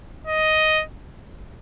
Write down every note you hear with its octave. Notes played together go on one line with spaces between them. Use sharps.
D#5